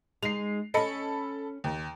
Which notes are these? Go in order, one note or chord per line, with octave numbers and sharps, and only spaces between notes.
G#3 D#4 C7 F7
C#4 A4 D#5 B5 C#7
D#2